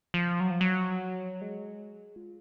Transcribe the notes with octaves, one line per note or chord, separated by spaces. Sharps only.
F3
F#3
F3
F#3
G#3
F4